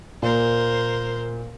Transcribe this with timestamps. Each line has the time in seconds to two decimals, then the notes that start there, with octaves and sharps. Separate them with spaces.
0.22 A#2 A#4 C5